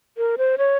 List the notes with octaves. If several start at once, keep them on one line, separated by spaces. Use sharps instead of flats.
A#4
C5
C#5